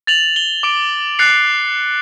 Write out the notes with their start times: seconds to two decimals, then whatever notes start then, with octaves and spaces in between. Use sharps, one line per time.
0.07 A6 F7 F#7
0.36 G7
0.63 D6 D7
1.19 F#6 A6 C7 C#7 F7